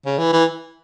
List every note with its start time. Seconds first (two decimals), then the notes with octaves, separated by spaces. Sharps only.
0.06 C#3
0.18 E3
0.33 E3